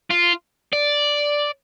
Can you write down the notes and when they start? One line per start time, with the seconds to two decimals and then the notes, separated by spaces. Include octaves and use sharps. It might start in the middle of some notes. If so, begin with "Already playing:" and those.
0.11 F4
0.73 D5